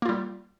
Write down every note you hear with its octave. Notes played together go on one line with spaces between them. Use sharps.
G3 A#3 F4